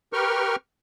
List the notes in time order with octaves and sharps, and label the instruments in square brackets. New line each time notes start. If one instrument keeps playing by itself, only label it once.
[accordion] G4 A#4 B4 G5 C#6 F6